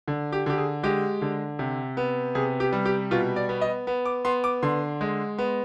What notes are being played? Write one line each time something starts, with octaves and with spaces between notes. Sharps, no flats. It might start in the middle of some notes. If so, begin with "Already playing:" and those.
D3
G4
D3 G4
G#4
G#3 G4
D3
C3
B3
C3 G#4
G4
G3
G4
B2 F4
D5
B3
D#5
B3
D6
B3 C6
D6
D3 C6
G#3
B3